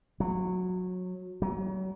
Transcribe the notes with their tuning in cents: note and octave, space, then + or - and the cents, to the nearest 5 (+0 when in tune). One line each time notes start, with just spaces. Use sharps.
F#3 -20
F#3 +35